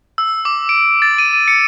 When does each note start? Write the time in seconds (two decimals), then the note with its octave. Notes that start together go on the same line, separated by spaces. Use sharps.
0.18 E6
0.45 D6
0.69 D7
1.02 A6
1.19 D#7
1.33 D#7
1.48 C#7